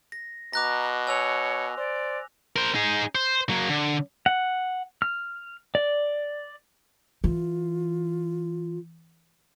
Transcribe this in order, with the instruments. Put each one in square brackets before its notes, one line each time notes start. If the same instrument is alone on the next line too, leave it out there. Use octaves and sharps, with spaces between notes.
[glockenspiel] A#6
[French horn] B2 [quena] A#5 [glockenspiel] D6 F#6 A#6
[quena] C#5 [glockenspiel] G#5 E6 F7
[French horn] C5 [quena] D5
[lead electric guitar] A#4 C5
D#4 G#4
C5
F#3 A#3
D3
[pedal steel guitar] F#5
F6
D5
[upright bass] E3 [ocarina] F4